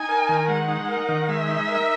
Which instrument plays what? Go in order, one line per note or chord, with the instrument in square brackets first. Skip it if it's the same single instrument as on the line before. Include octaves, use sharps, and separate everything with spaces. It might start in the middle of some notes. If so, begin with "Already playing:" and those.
Already playing: [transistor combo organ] D#4 [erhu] G#5
[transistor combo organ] A#4
D#3
[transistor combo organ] G#3 [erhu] F#5
[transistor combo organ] D#4
A#4
D#3
[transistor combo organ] G#3 [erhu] E5
[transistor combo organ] D#4
A#4